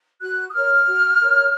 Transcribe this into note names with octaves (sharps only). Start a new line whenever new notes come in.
F#4 F#6
D#6
A#4 C#5 F6
F#4
A#4 C#5